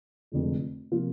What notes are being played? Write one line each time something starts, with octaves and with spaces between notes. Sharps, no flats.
F1 F2 D3 G#3
C3 F3 A#3 F4